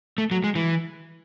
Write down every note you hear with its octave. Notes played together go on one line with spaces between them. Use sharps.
A3
F#3
G#3
E3